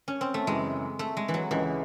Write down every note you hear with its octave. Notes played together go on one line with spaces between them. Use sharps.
C#4
C4
A3
F#2 C#3 E3 G#3
A3
G#3
E3
F#3
C#2 C#3 E3 G#3